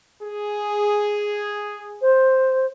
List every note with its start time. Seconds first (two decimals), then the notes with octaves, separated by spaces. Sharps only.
0.23 G#4
2.02 C5